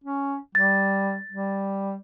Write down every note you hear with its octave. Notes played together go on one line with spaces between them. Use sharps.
C#4
G3 A6
G3